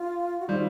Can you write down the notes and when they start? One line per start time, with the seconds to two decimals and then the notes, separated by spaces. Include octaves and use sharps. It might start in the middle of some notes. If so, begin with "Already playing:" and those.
Already playing: F4
0.40 F#4
0.47 D#3 G3 C4 F4